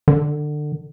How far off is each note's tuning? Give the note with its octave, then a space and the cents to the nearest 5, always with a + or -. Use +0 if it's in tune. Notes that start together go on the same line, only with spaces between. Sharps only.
D3 +25